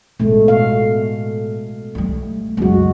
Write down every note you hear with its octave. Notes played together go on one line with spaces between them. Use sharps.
A1 B2 G#3 A3
F5
G3 A3
C#2 F#2 G#3 F#4